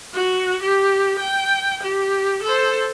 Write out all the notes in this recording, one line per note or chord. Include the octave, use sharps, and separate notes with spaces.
F#4
G4
G5
G4
A4 C5